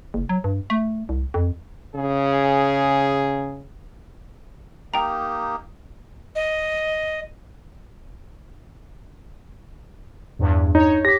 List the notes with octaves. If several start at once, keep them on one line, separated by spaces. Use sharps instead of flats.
F#1
F#3
G2
A3
C2
F2
C#3 G#4
A#3 D#4 G4 G5 A#5
D#5
E2 G2
D#4 C#5
G4 A#6 B6